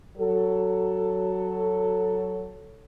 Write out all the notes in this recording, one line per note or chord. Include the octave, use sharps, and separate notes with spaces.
F#3 A4